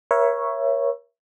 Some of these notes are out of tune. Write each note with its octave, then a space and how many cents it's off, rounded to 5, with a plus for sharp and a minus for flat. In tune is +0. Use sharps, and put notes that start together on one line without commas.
A#4 +35 C#5 -5 E5 +20